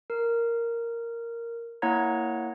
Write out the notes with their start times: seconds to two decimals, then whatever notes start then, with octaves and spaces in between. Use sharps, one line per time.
0.10 A#4
1.82 A#3 E4 C#5 F#5 A#5 G#6